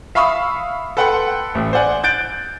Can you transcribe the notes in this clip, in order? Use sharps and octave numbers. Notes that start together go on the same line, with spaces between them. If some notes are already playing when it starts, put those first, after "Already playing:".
E5 F5 B5 C#6 D#6 E6
A4 B4 F#5 G5 C6
A1
C5 D5 F#5 G#5
F#6 G6 A6 D7